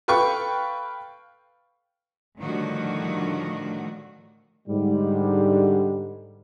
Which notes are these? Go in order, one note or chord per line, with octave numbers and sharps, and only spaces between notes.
A4 B4 F5 G5 C#6
A2 D3 D#3 F3 G3 F#4
G#2 D3 G3